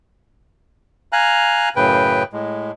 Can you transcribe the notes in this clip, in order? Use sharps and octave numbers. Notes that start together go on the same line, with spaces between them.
F5 G#5 A#5 F#6
F#2 A2 C#3 B4 G5
A2 G#3